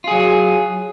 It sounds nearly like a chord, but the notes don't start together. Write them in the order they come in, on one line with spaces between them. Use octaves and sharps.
F4 G#4 F#3